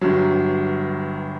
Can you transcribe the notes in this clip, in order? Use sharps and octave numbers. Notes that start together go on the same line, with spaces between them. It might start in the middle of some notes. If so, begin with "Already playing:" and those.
G1 G2 F#3